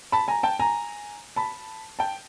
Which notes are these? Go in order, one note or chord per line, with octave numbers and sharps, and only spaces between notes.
A5 B5
G#5 A#5
G5 A5
G#5 A#5
A5 B5
G5 A5